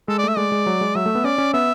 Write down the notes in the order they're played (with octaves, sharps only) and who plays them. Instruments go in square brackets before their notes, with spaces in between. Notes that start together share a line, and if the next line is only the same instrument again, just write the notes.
[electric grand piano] G#3 [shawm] A4
[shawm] D5
[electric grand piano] A3 [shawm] E5
[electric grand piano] G#3 [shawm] D5
[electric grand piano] G#3
F#3
G#3
[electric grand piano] F#3 [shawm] E5
[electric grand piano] A3
B3
[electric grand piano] C#4 [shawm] D5
[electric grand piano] C#4
[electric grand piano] B3 [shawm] E5